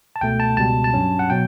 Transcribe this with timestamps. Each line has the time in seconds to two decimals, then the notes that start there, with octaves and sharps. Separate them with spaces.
0.16 A5
0.21 C#2 B2 A3 G5
0.40 A5
0.57 C#2 B2 G3 A5
0.84 A5
0.94 G2 F#3 C#4
1.19 F#5
1.30 B2 F#3 G5